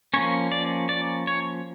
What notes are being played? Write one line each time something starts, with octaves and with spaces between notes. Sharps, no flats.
F3 A#3 C#4 C#5
D5
D5
C#5